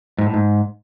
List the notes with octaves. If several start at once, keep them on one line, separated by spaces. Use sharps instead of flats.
G#2
A2
G#2